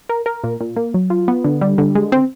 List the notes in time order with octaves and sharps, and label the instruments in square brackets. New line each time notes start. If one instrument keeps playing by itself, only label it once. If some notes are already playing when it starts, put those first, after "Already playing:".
[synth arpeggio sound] A#4
A#4
A#2
A#2
A#3
F#3
F4
B3
D3
G3
D3
G#3
C4